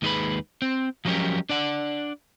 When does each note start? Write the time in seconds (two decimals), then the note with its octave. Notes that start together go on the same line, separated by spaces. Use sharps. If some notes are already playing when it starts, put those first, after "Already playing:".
0.02 D#2 G#3 D#4 G#4 B4 B5
0.62 C4
1.05 F3 F#3 G#3 C#4 G4 A#4
1.49 D4 D5 F#5